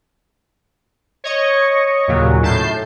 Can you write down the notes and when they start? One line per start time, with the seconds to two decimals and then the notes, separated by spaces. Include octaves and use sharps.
1.24 C#5 D#5 C#6
2.08 D#2 A#2 C#3 F#3
2.43 A2 A5 G6 C7